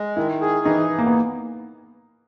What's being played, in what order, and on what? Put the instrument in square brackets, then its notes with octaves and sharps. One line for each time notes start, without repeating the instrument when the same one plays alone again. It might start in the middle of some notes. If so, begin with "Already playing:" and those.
Already playing: [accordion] G#3
[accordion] D#3 [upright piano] E4
[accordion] G#4
[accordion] E3 [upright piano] D#4
[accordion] E3
[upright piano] A#3
B3